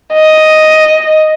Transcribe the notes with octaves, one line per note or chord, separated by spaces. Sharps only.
D#5